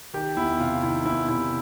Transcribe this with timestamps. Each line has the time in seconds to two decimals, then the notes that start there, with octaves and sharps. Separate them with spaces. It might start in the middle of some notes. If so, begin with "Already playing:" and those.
0.13 D#3 G4
0.37 E2 E4
0.60 C3 F4
0.83 D#3 E4
1.05 E2 E4
1.28 C3 E4